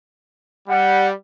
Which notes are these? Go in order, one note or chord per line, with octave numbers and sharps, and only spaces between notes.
G3 F#5